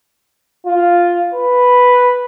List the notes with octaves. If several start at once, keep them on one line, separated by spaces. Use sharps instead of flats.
F4
B4